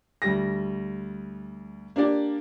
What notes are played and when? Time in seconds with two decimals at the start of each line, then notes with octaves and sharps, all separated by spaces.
0.22 D2 G3 A#6
1.96 A#3 D4 G4 D5